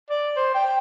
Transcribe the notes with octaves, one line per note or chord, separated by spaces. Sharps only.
D5
C5
G5